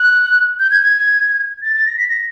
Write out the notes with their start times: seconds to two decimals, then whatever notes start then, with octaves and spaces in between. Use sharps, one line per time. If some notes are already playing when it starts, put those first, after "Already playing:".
Already playing: F#6
0.59 G6
0.71 G#6
0.82 G#6
1.62 A6
1.74 A6
1.86 A#6
1.98 B6
2.09 A#6